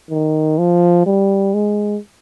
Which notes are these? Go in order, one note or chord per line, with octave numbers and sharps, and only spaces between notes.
D#3
F3
G3
G#3